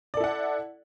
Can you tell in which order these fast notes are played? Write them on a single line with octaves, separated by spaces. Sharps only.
D5 A4 E4 F#5